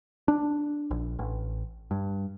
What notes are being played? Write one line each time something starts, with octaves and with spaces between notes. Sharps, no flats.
D4
A#1
A1
G2